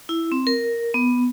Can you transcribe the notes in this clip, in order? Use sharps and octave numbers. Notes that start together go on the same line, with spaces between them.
E4
C4
A#4
B3